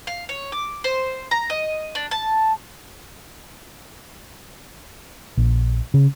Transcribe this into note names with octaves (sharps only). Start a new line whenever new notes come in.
F5
C#5
D6
C5
A#5
D#5
D4
A5
A#1
C#3